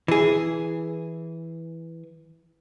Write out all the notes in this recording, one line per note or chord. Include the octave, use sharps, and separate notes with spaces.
E3 G#4